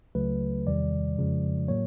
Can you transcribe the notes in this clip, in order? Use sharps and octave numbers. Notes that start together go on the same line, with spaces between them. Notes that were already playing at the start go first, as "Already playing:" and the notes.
C#2 C#3 F#3 A3 B4
E2 C3 D#3 G3 D5
F2 C#3 F3 G#3
A2 F#3 A#3 C#5